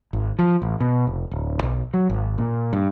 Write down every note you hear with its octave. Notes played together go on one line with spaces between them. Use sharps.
G#1
F3
A1
B2
F1
D1
B1
F#3
G#1
A#2
G2